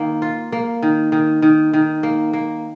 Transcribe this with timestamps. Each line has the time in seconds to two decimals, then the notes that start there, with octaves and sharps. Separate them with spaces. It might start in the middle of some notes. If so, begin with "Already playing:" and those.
Already playing: D#3 A#3
0.22 F4
0.52 A#3
0.82 D#3
1.12 D#3
1.42 D#3
1.73 D#3
2.03 A#3
2.33 A#3